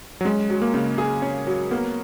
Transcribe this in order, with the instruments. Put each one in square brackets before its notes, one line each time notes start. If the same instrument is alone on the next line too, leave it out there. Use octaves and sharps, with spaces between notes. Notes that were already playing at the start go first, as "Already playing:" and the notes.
[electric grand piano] F#3
[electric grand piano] G#3 [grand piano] C#4
[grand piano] F#3
[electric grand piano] A#3
[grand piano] C#3
G#4
C#4
F#3
[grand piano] A#3 [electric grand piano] B3